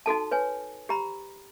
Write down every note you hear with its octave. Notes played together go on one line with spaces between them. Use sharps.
D#4 F#4 A4 A5
B4 C#5 G#5
G4 A#5 B5